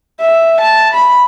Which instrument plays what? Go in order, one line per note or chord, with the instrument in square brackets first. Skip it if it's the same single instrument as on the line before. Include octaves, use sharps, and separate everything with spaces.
[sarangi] E5
A5
B5